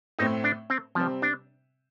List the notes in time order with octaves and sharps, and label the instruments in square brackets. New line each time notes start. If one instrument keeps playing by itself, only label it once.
[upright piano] A2 A3 C4 [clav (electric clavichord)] D#4
[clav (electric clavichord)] D4
C4
[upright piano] C3 G3 C4 [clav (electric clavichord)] F3
[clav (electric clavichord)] D4